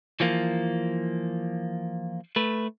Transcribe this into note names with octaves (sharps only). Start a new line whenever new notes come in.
E3 F3 A#3
A3 B4